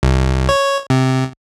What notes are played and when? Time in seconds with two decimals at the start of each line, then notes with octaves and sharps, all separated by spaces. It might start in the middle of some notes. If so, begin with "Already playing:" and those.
0.03 C2
0.49 C#5
0.90 C3